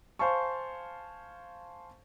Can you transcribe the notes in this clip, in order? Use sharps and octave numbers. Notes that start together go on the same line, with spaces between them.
C5 F5 G#5 A5 C#6